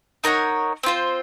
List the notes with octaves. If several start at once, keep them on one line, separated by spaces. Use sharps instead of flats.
D#4 A#4 C#5 F#5
C4 F4 C5